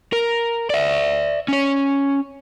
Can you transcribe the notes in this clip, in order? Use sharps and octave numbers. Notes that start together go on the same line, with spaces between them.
A#4
D5 E5
C#4 C#5